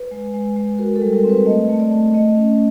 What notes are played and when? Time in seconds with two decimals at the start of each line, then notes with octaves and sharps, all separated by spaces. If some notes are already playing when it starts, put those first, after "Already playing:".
Already playing: B4
0.11 G#3
0.34 G#3
0.56 G#3
0.79 F#4 A#4
0.96 A4
1.02 G3
1.13 A#4
1.24 C4
1.30 B4
1.46 A3 D#5
1.69 A3
1.80 D5
1.92 A3
2.14 A3 D#5
2.37 C#4